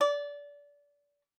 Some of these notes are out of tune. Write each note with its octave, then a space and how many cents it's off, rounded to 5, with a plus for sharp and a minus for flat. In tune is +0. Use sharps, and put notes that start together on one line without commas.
D5 -25